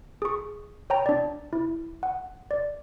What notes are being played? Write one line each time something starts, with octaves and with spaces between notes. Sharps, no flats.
G#4 C#6
C#5 G5 A#5
D4 D5
E4
F#5
D5